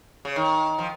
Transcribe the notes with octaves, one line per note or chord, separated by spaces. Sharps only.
C#3
D#3
F3